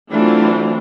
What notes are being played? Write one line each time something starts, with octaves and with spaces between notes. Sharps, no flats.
E3 F#3 A3 C4 D4 F4